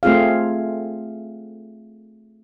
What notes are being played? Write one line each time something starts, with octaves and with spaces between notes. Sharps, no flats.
A3 C4 F4 G#4 F5